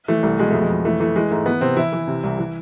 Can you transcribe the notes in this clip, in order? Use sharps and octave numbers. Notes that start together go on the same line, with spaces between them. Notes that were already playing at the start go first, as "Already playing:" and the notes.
E3 A3
C2 A3
B2 G#3
F2 A3
G#3
F2
E3 A3
E3 A3
E3 G#3
G#2 A3
E3 B3
C3 C4
E3 E4
E3
C3
C2
E3